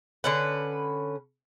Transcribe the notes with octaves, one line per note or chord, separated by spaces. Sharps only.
D3 C#4 B4